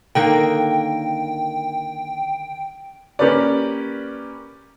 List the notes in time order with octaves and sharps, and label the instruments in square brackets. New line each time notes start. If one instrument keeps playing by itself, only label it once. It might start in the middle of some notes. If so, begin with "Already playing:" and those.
[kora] D3 D#3 A#3 [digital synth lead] G5
[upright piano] A#3 C#4 G4 A#4 B4 D5